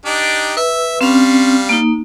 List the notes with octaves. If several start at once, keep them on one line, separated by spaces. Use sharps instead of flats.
D4 D#4 G4
B4 E5
G3 C4 C#4 F5
A#3 D#4